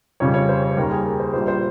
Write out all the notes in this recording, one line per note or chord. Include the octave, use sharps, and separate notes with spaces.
F2 C#3 G3 C#5
C#5
C5
C5
D#2 D#3 G3 A#4
G#4
A#4
C5
A#1 A#2 G3 C5
C5